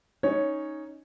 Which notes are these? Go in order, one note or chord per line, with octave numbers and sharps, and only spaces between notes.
C#4 D#4 C#5